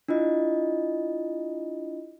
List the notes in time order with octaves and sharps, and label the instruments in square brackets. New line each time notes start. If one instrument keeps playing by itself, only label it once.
[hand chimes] D4 E4 F4 D#5